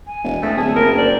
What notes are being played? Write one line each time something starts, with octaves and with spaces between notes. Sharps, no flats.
G#5
E1
E2 A3
D1 G#4 A5
F#1 A#4
C5 D5